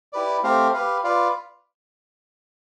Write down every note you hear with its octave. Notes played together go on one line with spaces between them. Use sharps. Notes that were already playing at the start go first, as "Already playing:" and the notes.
E4 G4 B4 D5
A3 C4 G4 C5 F5
G4 B4 F5
F4 B4 D5 F5